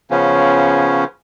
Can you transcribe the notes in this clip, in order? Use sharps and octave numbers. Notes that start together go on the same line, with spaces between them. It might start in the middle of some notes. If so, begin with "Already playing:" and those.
C#3 F3 B3 C#4